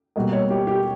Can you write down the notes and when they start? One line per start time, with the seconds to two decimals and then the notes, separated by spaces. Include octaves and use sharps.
0.16 B2 G3 A#3 D#5
0.32 C#5
0.50 G4
0.67 G4